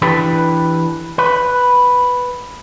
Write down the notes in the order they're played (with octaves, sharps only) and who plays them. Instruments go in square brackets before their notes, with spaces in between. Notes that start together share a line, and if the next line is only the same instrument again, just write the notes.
[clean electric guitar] E3 D4 G4 A4 B4
B4